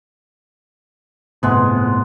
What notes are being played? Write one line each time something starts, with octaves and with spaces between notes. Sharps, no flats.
G1 A2 C3 G#3 B3 G#4